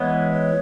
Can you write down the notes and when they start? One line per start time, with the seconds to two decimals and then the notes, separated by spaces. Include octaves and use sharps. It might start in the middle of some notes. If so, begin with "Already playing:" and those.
Already playing: E3 G#3 B3 C#5
0.31 C#5